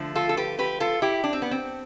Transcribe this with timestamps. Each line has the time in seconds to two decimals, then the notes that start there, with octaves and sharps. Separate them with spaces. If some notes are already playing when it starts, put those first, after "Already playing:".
Already playing: D3 F3 A3
0.15 F4 A4
0.29 A4
0.37 G4 B4
0.59 G4 B4
0.80 F4 A4
1.02 E4 G4
1.24 D4
1.33 C4
1.42 B3
1.51 C4